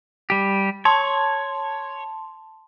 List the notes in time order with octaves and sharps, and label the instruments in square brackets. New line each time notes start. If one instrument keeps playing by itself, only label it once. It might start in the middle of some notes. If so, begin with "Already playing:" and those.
[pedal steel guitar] G3 G4
[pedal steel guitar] C#5 [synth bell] A5 C6